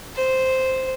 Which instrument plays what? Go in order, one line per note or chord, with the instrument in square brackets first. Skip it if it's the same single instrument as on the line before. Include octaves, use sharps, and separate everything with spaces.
[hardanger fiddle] C5